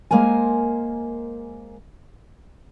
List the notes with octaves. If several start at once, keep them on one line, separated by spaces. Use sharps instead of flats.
G#3 A#3 A#4 C5 G#5